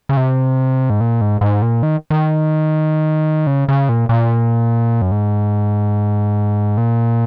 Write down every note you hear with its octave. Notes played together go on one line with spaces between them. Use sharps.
C#3
C3
G#2
A#2
G#2
G#2
A#2
D#3
D#3
C#3
C#3
A#2
A#2
F#2
G#2
A#2